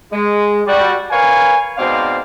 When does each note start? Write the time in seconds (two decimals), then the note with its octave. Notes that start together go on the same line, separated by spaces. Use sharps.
0.11 G#3
0.67 G3 F#4 D5
1.11 A#4 B4 C#5 F5 G#5
1.78 G#2 B2 C4 C5 D5 F5